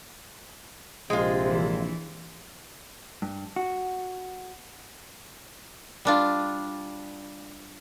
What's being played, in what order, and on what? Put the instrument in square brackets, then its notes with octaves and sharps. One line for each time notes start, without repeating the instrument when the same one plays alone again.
[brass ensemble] A#1 C3 [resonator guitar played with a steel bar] G#3 F4
[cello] E3
[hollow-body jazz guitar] G2
F#4
[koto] G3 D4 F4